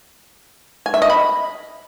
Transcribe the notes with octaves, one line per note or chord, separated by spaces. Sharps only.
G#5
E5
D#5
B5